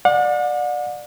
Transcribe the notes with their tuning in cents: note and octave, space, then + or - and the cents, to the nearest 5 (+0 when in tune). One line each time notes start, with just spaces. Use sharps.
D5 +20 F#5 -40